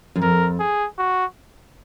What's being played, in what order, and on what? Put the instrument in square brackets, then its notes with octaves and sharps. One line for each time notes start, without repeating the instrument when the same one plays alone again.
[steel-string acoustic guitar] F#2
[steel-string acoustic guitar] F2 [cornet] A#4
[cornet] G#4
F#4